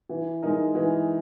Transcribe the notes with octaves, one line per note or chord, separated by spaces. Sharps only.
E3
G#3 D#4 A#4
E3